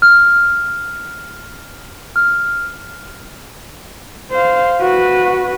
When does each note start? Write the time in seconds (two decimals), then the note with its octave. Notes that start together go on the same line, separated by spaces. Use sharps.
0.02 F6
2.16 F6
4.31 C5 F5
4.81 F#4 B4